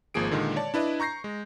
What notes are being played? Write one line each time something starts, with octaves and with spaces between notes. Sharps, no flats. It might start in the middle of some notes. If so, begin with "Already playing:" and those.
G#1 F3 A#3 G#4 D7
A#2 D3 D#3 G#3
C#5 D5 A5
D4 E4 B4 D5 D#5
A#5 C#6 G6 A#6 C7
G#3